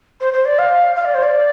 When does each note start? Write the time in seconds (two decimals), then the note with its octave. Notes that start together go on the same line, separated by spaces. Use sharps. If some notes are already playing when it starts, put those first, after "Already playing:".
0.20 C5
0.33 C5
0.45 D5
0.59 F5
0.96 F5
1.05 D5
1.14 C5
1.23 D5